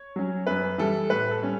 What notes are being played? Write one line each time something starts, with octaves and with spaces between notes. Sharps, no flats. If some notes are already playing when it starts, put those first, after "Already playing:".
Already playing: C#5
F#3 C#4
F#2 B4
E3 G3 A4
A2 B4
A4
G3 C#4